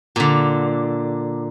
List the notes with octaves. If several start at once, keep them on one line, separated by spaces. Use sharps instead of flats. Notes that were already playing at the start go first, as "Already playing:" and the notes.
A#2 D3